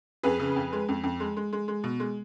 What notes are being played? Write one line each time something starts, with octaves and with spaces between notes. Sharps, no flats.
F2 G#4 B4
C#3
F2
G#3
F2
F2
G#3
G#3
G#3
G#3
B2
G#3